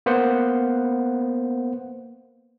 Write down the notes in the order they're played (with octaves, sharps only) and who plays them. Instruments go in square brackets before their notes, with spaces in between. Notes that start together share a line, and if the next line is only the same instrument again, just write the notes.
[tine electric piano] A#3 B3 C5 F#5